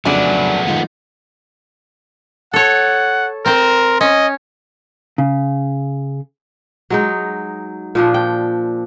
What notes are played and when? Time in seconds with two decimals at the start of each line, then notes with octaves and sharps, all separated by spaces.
0.05 F2 C#3 F#3 A3 B3 D4 G#5
0.68 D#3 F3 G#3 D#4 F4
2.53 A4 C#5 F#5
3.46 C4 A#4 C5
4.01 C#4 D#5
5.18 C#3
6.90 F#3 G#3 D#4
7.95 A#2 F3 D4
8.14 G5